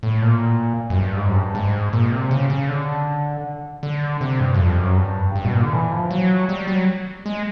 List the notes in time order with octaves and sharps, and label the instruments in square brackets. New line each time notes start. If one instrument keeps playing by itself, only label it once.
[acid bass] A2
A#2
F#2
G2
G#2
F#2
G2
G#2
A#2
C3
C#3
C#3
D3
D3
C3
G2
F#2
F2
F#2
G2
G2
B2
A#2
D3
E3
F3
F#3
G3
F#3
G#3